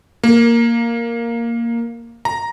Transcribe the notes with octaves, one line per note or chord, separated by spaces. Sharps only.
A#3
A#5